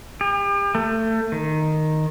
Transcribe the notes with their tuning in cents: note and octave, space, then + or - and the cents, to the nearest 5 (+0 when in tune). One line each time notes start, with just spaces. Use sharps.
G4 +40
A3 +25
D#3 -5